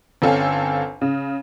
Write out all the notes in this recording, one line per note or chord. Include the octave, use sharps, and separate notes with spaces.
G1 C4 C#4 A4 F5 G#5
C#3